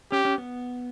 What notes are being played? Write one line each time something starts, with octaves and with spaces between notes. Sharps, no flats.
C#4 G4
C#4
B3